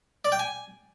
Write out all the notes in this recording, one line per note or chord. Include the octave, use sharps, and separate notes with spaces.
D5
G5
G#5